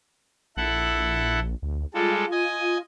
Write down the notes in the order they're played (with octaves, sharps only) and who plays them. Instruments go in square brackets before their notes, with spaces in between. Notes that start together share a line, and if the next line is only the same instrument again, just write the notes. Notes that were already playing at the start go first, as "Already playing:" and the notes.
[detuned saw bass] A#1 [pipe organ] E4 A4 F#5
[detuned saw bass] D2
[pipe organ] G3 G#3 A4 [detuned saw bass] F4
[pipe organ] D#5 G#5